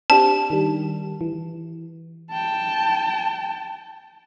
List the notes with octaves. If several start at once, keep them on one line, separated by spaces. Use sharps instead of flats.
C4 D4 G4 A5
D#3 G3
E3
G5 A5